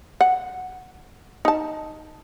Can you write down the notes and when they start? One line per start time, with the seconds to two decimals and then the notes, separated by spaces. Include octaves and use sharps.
0.21 F#5
1.45 D#4 A5